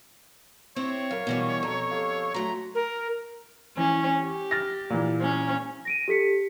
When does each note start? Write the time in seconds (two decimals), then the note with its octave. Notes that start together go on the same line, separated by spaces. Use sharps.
0.76 C4 E4 G4 C#5
1.11 F#2 A#4 F5
1.27 B2 E3 G3
1.63 F2 A4 A#5 C#7
1.91 G4 A4 F5
2.34 F#3 A3 A#5 C6
2.75 A#4
3.77 E3 C#4
4.21 G4
4.51 F6 A6 A#6
4.90 A#2 E3
5.21 C#4
5.85 A#6 D7 D#7
6.08 G4 A4 B6 C#7